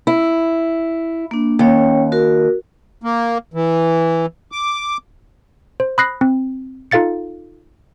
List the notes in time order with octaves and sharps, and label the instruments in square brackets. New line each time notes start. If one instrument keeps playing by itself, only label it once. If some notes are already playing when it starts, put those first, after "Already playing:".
[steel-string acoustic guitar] E4
[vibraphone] A#3 D4
[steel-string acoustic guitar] D#2 [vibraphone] C#4 C#5 G5
[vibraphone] F#4 A#4
[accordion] A#3
E3
D6
[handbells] C5
B5 D#6 F#6 A#6 C7
C4
D#4 F4 A4 F5 A6 C#7